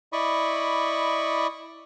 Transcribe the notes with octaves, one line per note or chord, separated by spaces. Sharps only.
E4 D5 D#5 B5 C#6